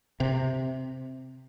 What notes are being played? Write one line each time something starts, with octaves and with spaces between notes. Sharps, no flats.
C3